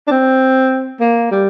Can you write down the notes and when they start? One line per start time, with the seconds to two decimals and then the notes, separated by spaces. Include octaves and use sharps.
0.07 D4
0.11 C4
1.00 A#3
1.31 G3